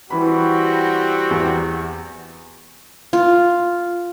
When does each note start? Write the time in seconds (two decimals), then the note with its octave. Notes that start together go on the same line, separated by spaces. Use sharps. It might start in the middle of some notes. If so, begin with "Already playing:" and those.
0.11 E3 G3 C4 F#4 B5
1.30 E2
3.13 F4